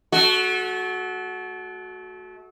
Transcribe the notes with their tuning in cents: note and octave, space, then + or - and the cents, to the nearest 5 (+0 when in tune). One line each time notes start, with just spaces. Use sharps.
A3 -30 F#4 +0